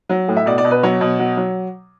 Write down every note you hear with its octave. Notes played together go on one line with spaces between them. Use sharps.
F#3
A2
E5
B2 D5
D5
B2
B4
F#3 C#5
B2
F#3
F#3